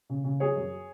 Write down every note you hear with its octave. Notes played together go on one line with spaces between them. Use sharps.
C#3
C#3
F#3 G#4 C#5
F#2